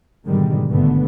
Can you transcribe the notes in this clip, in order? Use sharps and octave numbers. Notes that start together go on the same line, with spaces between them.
G#2 B2 D3 D#3 G3 G#3
G#1 G2 D3 A3 B3